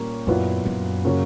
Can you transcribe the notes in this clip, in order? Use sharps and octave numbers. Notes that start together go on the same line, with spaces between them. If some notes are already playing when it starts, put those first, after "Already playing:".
Already playing: A#2 G3 A#3 C#4
F#2 A#2 F#3 B3 E4
F#2
C#3 F#3 A#3 C#4